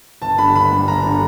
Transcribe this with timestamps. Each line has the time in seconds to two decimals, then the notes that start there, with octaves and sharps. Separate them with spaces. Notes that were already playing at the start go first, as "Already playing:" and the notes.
0.22 G1 A5
0.38 G2 D3 G3 B5
0.55 G1 B5
0.71 G2 D3 G3
0.88 G1 A#5
1.06 D3 G3